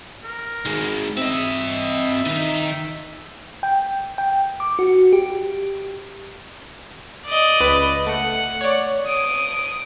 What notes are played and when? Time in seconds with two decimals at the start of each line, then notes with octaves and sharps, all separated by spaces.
0.24 A#4
0.65 D#3 G#3
1.17 C4 D#5 E5
2.26 D#3 D#4
3.63 G5
4.18 G5
4.60 D6
4.79 F#4
5.13 G4
7.26 D5 D#5
7.60 C#2 B4
8.06 A3 F#5
8.61 C#5 D5
9.07 D#6 D7